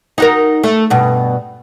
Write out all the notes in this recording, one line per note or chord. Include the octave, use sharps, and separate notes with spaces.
D#4 F#4 A#4
A3
G2 B2